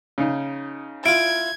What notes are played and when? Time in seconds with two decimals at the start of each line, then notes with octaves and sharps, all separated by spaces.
0.18 C#3 D#4
1.05 E4 F4 G#6 D7